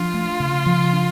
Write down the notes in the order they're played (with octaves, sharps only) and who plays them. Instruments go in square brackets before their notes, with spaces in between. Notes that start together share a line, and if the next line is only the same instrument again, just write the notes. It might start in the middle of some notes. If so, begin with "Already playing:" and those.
Already playing: [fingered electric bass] F3 D4 [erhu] F4
[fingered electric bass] A3
C#3
F3
D4